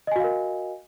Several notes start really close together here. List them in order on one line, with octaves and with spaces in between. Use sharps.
D#5 G#5 F#4 F5 A#4